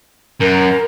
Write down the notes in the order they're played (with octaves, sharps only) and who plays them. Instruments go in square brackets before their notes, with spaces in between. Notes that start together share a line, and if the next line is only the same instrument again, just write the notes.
[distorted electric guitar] F#2 [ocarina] A#4